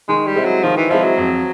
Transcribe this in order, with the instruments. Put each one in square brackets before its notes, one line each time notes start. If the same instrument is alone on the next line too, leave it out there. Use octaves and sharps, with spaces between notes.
[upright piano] D#3 [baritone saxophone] G#3
[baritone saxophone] G3
[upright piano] G#3 C4 E4
[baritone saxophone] F#3
[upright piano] D#3 [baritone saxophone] F3
[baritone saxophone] E3
[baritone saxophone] F3 [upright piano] G#3 C4 E4
[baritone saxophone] F#3
[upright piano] F2